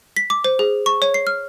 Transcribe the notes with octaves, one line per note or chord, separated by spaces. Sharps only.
B6
D6
C5
G#4
C#6
C#5
C7
F6